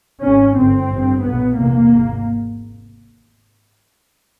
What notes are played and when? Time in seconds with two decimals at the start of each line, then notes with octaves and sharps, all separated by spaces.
0.23 G#1 G#2 C#4
0.57 G1 G2 C4
0.90 A1 G2
1.24 B1 A#2 B3
1.58 F1 E2 C3 A#3
1.91 G#1 G#2